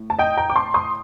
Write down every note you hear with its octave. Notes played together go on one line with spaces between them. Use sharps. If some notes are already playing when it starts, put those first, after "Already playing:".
Already playing: A2
A5
D#5 G5
G5 A#5
D6
A5 C6
C6 D#6